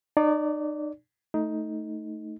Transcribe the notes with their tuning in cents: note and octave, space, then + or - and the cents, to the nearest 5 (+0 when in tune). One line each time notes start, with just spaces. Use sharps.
D#4 -40 D5 -20
A3 +0 D#4 +10